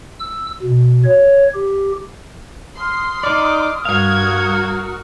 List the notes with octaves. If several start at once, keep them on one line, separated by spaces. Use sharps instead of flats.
E6
B2
C#5
G4
C6 D#6 F6
D#4 D5 D6
G2 F#4 A#4 F5 G#6